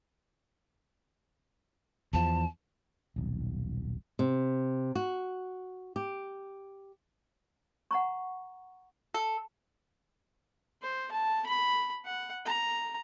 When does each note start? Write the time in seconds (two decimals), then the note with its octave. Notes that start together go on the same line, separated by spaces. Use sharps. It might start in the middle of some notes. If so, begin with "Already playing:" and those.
2.13 E2 F3 A5
3.16 D#1 B1
4.19 C3
4.95 F#4
5.96 G4
7.91 F#5 A#5 C#6
9.14 A4
10.82 C5
11.12 A5
11.46 B5
12.05 F#5
12.45 A#5